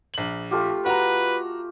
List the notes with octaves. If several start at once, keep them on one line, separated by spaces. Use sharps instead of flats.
A#1 F#7
A3 F4 G4
F#4 B4 A#5